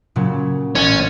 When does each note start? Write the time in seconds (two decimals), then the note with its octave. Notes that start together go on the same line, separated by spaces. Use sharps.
0.16 A#2 C#3 F#3
0.75 A1 C#4 A6